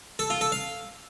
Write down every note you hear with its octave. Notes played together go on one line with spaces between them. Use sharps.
A4
F4
A4
F5